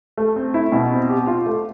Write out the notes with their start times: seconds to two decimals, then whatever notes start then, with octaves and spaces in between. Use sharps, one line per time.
0.17 A3
0.36 C4
0.54 E4
0.72 B2
0.91 C4
1.09 G4
1.27 F4
1.46 A3